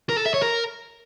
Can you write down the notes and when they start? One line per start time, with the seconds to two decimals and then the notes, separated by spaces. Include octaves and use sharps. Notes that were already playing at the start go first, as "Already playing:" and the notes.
0.09 A#4
0.17 A4
0.26 E5
0.34 C#5
0.42 A#4